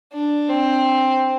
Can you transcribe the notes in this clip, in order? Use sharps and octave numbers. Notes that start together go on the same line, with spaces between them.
D4
C4